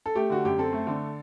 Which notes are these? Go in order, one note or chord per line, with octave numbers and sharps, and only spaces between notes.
A4
A3 G4
D3 F#4
F#2 G4
C4 A4
A3
D3